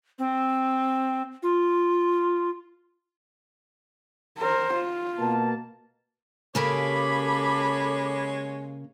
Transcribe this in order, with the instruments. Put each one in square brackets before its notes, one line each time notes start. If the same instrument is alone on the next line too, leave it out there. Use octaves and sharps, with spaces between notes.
[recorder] C4
F4
[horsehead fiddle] A#4 C5
F4
[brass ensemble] B2 A#3 A5
[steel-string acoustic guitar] C#3 A#3 G4 [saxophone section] G#3 C#5 [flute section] A4 D6 [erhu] B5